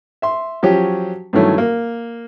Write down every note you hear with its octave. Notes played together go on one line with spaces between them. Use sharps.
E5 C6
F3 F#3 C#4 G4
G2 D#3 E3 F#3 A3 C#4
A#3